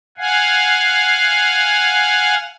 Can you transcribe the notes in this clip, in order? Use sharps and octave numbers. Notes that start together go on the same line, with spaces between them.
F5 F#5 G#5